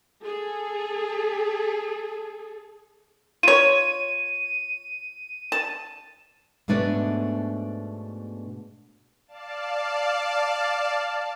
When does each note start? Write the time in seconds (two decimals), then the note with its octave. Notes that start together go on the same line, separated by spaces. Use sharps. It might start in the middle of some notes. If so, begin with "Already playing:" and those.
0.22 G#4 A4
3.43 F4 C#5 D#7
5.52 A5
6.68 G#2 B2 A3 D4 B4 C#5
9.27 D5 F5 A5